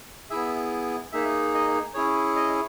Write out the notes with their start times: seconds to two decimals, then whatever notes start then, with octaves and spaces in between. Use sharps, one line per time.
0.30 B3 E4 G#4 E5
1.12 A#3 D#4 G#4 E5
1.54 D#5
1.94 C#4 E4 G#4 C#5
2.36 D#5